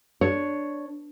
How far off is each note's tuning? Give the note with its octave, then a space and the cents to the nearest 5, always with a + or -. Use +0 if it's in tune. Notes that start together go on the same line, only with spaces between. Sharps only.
D4 +0 C#5 +0